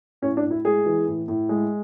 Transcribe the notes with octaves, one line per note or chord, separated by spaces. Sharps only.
A2 C#4
D4
A2
E4
G#3 G#4
E3
A2
A2
G#3